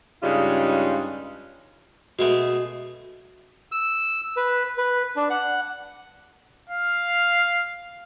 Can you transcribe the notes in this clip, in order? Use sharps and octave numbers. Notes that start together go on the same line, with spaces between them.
G2 C#3 G3 G#3 D#4 F4
B2 G#3 A3 F#4
E6
B4
B4
D4
F#5
F5